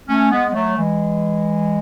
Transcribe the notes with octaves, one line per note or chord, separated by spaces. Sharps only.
A3 C#4
G#3 B3
B3
F#3 A3
E3 G#3